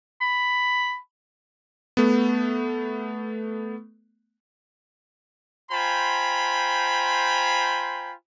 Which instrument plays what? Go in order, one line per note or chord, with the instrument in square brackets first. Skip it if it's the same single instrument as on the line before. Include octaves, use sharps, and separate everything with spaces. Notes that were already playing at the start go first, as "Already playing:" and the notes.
[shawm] B5
[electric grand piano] A3 B3
[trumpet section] F4 C5 G5 G#5 A#5 B5